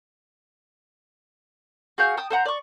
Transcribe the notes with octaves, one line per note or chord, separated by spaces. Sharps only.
F#4 G#4 F5 G6
G5 A5 D#6
A4 C5 F#5 A#5
D5 C#6